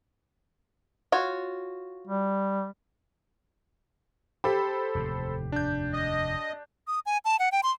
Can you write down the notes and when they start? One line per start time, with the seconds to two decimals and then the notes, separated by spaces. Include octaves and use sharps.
1.12 F4 F#4 C#5
2.07 G3
4.44 G4 A4 C5 B5
4.95 F1 D#2 A2
5.52 D4 G6
5.93 D#5
6.87 D#6
7.06 G#5
7.25 A5
7.39 F#5
7.52 G5
7.63 C6